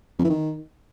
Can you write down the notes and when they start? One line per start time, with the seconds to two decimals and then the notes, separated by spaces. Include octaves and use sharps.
0.19 F2
0.24 E3
0.30 D#3